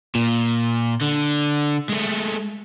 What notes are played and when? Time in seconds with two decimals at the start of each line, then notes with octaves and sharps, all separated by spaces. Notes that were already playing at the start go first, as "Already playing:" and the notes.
0.15 A#2
1.01 D3
1.89 G#3 A3